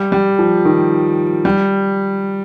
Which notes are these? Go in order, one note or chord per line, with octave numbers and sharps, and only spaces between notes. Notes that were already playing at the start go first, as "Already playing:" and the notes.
Already playing: G3
G3
F3
D#3
G3